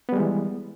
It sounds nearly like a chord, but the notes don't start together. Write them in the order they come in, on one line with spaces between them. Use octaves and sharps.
B3 G3 G#3 E3